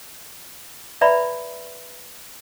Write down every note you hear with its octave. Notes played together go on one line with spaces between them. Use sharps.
B4 D5 E5 A#5 B5